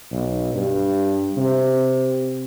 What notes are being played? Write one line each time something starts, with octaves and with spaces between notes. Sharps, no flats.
B1
G2
C3